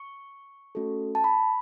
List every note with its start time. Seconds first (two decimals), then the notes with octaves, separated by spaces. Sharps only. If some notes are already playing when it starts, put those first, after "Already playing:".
Already playing: C#6
0.75 A3 C#4 F#4 A4
1.15 A5
1.24 B5